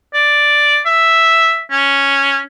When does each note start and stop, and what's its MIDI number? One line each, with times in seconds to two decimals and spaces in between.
0.14 0.80 74
0.86 1.62 76
1.71 2.39 61